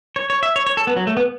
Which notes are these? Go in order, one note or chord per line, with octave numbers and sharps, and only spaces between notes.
C#5
C#5
E5
C#5
C#5
A4
B3
F#3
A3
B3